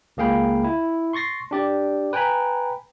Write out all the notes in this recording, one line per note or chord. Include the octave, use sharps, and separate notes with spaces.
C#2 A#3 G#4 F5 G5 B5
E4
C6 C#6 A6 A#6 C7
D4 G4 D5
B4 G5 G#5 A#5 B5